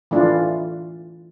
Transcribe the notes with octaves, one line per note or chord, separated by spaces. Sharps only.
E3 A3 D4 F4